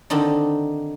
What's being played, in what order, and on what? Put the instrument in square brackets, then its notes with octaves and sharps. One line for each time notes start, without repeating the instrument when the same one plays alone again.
[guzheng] D3 D#3 C4 D4 D#4